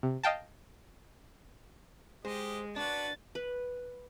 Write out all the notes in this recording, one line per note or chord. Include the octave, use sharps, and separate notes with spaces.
C3
D#5 F5 G5 A5
G#3 G4 C5 D#5
D4 F#4 B4 A6
B4